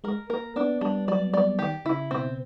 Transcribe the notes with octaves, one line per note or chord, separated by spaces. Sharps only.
G#3 A#4
A#3 A#4
B3 D4
G3 D4
F#3 D5
G3 D5
D#3 G4
C#3 E4
B2 C4